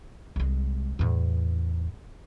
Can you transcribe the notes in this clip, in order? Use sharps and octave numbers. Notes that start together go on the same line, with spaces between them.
C2 G#3
E2 A2